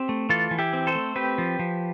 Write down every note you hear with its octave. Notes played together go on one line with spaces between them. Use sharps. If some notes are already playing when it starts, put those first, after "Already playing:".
Already playing: C4 G4
A3
E3 F4 A4
E3
E4 G4
C4
A4 C5
A3
C4 G4 B4
F3
F3